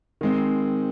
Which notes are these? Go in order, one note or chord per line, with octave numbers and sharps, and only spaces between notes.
D#3 G#3 C4